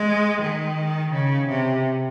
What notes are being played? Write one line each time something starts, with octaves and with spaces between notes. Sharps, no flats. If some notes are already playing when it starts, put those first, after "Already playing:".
Already playing: G#3
D#3
C#3
C3